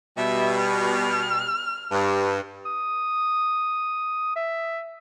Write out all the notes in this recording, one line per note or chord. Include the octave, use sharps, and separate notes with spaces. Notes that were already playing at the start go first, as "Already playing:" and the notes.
B2 G3 E5
F6
G2
D#6
E5